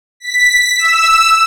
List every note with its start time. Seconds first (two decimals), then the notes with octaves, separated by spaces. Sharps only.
0.20 B6
0.79 E6